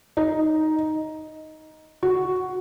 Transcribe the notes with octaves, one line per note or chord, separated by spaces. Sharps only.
D#4
F#4